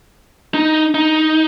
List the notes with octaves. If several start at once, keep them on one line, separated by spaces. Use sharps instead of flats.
D#4
D#4